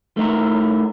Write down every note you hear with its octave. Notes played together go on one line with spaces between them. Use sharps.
A3 D#4 E4 A#4